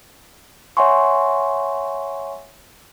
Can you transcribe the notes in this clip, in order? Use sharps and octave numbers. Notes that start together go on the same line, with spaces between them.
C#5 E5 F#5 G#5 C6 C#6